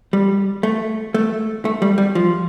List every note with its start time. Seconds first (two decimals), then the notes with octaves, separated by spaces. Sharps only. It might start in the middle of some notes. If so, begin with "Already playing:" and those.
0.13 G3
0.63 A3
1.14 A3
1.65 A3
1.82 G3
1.98 G3
2.15 F3